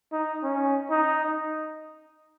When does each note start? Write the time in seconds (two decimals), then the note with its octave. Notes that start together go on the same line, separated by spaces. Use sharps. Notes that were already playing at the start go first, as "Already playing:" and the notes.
0.12 D#4
0.43 C#4
0.90 D#4